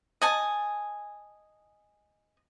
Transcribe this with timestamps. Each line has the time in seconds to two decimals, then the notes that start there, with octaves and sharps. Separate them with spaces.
0.21 D#5 G#5 A5